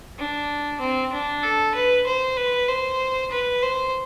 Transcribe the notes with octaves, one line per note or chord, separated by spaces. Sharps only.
D4
C4
D4
A4
B4
C5
B4
C5
B4
C5